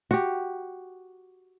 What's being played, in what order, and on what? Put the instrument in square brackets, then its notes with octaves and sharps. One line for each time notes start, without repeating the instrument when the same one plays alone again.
[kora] F#4 G4